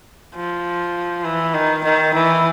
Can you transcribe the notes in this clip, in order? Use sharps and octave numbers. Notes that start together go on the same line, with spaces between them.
F3
E3
D#3
D#3
E3